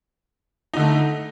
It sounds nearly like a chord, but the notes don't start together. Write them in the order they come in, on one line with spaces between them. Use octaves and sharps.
D#4 D3 A3